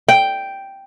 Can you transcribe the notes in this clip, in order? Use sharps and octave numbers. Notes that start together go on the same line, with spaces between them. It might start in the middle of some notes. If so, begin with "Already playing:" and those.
G5